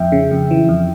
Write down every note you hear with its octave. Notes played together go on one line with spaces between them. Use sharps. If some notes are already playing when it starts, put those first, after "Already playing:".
Already playing: F2 E5 G5
C#3
F2
E3
F2